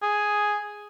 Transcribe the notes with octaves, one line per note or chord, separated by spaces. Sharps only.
G#4